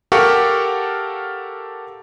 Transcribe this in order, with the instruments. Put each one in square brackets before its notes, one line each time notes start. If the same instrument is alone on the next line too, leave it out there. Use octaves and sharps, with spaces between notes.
[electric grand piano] G4 A4 A#4 F5 F#5 C#6